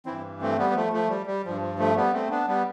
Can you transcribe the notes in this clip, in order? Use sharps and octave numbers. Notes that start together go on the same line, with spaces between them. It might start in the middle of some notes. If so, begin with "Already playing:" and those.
G2 E3 C4 E4
A3 C4
G3 B3
B3
F3 A3
F3 A3
G3
G3
G2 F3
F3
F3 A3
G3 B3
A3 C4
B3 D4
G3 B3